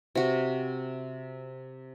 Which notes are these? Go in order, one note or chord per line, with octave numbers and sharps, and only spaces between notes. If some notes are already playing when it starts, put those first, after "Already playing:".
C3 F#4